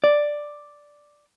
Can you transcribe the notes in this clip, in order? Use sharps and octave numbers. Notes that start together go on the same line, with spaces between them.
D5